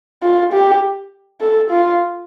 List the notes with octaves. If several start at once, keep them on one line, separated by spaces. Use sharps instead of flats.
F4
G4
A4
F4